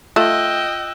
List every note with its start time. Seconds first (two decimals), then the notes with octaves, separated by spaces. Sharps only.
0.16 A3 F4 D#5 G5 E6 F#6 E7